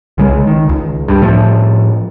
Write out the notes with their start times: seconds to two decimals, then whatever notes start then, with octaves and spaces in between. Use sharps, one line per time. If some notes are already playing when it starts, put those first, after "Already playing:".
0.18 C2 C#3 G#3
0.47 D#3
0.69 C#2
1.08 G2
1.22 A2 F3